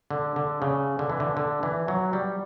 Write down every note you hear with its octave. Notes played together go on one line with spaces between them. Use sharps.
D3
D3
C#3
D3
E3
D3
D3
E3
F#3
G3